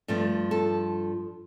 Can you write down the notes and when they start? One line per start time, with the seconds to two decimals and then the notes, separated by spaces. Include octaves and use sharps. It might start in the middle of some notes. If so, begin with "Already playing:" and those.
0.08 G2 F3 A3
0.51 A4